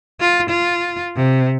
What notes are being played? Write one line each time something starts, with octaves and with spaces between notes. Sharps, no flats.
F4
F4
C3